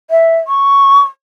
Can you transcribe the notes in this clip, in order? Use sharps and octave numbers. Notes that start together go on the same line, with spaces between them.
E5
C#6